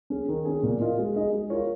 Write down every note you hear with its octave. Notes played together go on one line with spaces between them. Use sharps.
C#4 G#4
D#3
C#4 G#4
A#2
A#3 F4 A#4 D#5
G#3
D#4 G#4 D#5
G#3
F4 A#4 C#5